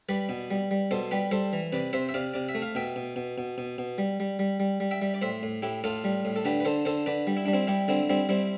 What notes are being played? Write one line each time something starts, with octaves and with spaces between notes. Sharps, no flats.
G3 B4 D5
B2
G3
G3
B2 A4 C5
G3 G4 B4
G3 A4 C5
E3
C3 B4 D5
C3 C5 E5
E5
C3 D5 F5
C3 D5
E5
A3
F5
B2 E5 G5
B2
B2
B2
B2
B2
G3
G3
G3
G3
G3
E5 G5
G3
D5
A2 C5 E5
A2
A2 E4 G4
A2 F4 A4
G3
A2
A4
D3 G4 B4
B4
D3 A4 C5
D3 A4 C5
D3 B4 D5
G3
E4
G3 D4
C4 E4
G3 E4 G4
D3 C4 E4
G3 C4 E4
G3 C4 E4